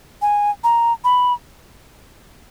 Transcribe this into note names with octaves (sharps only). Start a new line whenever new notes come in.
G#5
A#5
B5